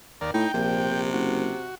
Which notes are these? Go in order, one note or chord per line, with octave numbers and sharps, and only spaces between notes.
D#2 D#3 A#4 D5
A2 D#4 G5
A#1 C3
A#1
F#1 F#4